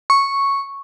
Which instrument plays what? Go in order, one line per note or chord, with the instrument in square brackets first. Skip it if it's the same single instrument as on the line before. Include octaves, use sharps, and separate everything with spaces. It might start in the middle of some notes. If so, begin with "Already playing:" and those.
[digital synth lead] C#6